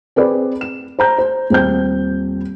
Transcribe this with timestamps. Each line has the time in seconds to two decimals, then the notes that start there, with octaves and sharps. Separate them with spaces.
0.16 C4 G#4 B4 D5
0.61 E7
0.99 C5 A#5 G6
1.18 C5
1.50 D#1 C4 G6